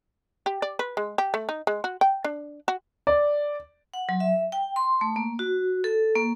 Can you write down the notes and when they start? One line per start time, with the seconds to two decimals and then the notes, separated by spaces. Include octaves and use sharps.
0.46 G4
0.62 D5
0.79 B4
0.97 G#3
1.18 G4
1.34 A3
1.49 D#4
1.67 G#3
1.84 F#4
2.01 G5
2.24 D4
2.68 F#4
3.07 D5
3.94 F#5
4.09 F#3
4.20 E5
4.52 G5
4.76 C6
5.01 A3
5.16 A#3
5.39 F#4
5.84 A4
6.16 A#3